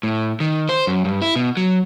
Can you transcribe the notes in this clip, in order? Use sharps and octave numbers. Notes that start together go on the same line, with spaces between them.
A2
D#3
C5
F#2
G2
E4
B2
F#3